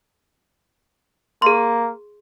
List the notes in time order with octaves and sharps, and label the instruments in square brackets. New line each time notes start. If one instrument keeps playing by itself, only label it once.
[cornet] A#3 [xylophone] G#4 C6